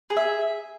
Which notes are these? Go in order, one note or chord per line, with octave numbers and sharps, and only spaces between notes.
G#4
E5